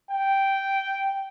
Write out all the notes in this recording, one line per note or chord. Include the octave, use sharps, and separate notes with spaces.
G5